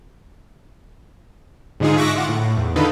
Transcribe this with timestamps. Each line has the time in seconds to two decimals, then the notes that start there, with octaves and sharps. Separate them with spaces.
1.80 G#2 D3 G#3 D#4 F4 G#4
1.97 E5 C#6 D6 F#6 A#6
2.16 F4 F#5 D6
2.29 A2
2.57 E2
2.76 D3 D#3 D#4 F4 A4 B4